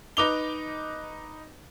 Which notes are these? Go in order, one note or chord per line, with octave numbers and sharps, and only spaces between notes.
D#4 B4 D6 F7 G7